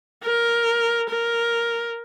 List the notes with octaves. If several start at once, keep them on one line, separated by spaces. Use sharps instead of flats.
A#4
A#4